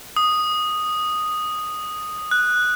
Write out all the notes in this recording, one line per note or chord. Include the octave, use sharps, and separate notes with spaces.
D#6
F#6